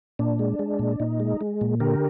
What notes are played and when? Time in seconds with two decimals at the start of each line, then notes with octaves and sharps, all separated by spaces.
0.19 A#2 D4
0.39 G#3
0.59 G#3
0.79 A#2
1.00 A#2 D#4
1.20 G#3
1.41 G#3
1.61 A#2
1.80 D3 G4 A#4